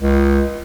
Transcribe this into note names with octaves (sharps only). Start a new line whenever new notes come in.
C#2